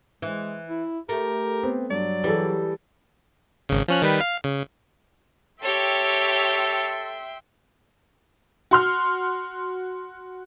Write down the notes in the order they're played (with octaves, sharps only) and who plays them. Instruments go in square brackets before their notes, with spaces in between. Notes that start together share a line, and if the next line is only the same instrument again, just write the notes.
[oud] E3 [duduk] G#3
[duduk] E4
[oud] A3 [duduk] G4 [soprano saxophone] A#4
[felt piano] B3 C4
[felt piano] G2 [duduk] F#3 [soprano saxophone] D5
[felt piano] E3 G#4 A4 [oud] G3
[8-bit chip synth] G#1 C#3
F3 C#4 F#6
D#3 G3 B4
F5
C#3
[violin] G4 C#5 [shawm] A4 [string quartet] E5 G5 C6
[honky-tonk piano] F#4 C6 F6